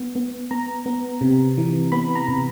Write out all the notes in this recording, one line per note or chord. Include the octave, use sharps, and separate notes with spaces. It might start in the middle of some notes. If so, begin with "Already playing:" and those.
Already playing: B3
B3
B3 A#5
B3
C3
E3
B3 B5
A#5
C3